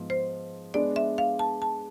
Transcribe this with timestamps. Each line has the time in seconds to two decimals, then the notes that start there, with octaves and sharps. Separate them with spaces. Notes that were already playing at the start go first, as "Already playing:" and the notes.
Already playing: G#2 F3 B3
0.10 C5
0.74 G#3 B3 D4 D5
0.96 E5
1.18 F5
1.39 A5
1.62 A5